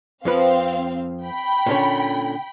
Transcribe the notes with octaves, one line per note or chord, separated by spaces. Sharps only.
F2 F3 C4 B4 F5
G5 B5
A#2 D3 C#4